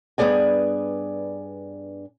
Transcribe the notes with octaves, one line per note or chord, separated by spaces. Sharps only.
G2 G#3 B3 G#4 D5 G#5